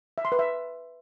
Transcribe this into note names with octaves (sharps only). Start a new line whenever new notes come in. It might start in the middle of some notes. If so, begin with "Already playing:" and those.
E5
C6
B4
E5